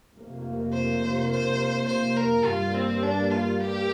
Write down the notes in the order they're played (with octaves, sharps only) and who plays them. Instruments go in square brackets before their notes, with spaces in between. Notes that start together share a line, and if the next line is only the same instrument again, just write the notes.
[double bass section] F1 F2 C3 A#3
[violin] C5
C5
C5
A#4
[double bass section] G2 G3 A#3 [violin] F4
[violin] C4
D4
F4
G4